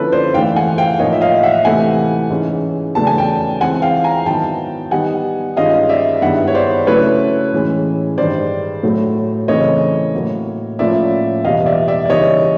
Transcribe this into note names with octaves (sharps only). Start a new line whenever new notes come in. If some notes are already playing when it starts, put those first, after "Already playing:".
Already playing: D3 F3 A#3 C#4 E4 A4 B4
C5 D5
G#2 E3 A3 F5 G5
F#5 G#5
F5 G5
A2 F3 A#3 D#4 C#5 D#5
E5
D#5 F5
E5 F#5
C3 E3 A3 C4 E4 F#5 G#5
G#2 E3 G#3 C#4
E2 C#3 F#3 A3 D4 A5
G#5
G5 A5
E3 G#3 C4 E4 F#5 G#5
F5 G5
G#5 A#5
G#2 D#3 F#3 B3 E4 G5 A5
D#3 G3 B3 D#4 F#5 G#5
G2 D#3 G#3 C#4 F4 D#5 F5
D5 E5
G2 D#3 G#3 B3 E4 E5 F#5
C#5
C5 D5
C#3 F#3 A3 C#4 E4 B4 C#5
A2 E3 G#3 C#4
G2 D#3 G#3 C5 D5
A2 F#3 A3
C#3 E3 A3 C4 C#5 D#5
A2 F#3 A#3
A2 F3 A#3 C#4 F4 D5 E5
E2 B2 G3 D#5 F5
D5 E5
D5 E5
D5
C#3 E3 G3 A#3 D#4 C#5 D#5